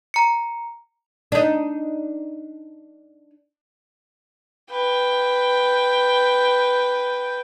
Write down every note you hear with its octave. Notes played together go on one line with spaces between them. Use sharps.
A#5 C#7
D4 D#4
B4 G5